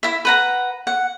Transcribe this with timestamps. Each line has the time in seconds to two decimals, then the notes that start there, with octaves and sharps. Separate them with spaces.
0.03 E4 E5
0.25 B4 F#5 A#5
0.87 F#5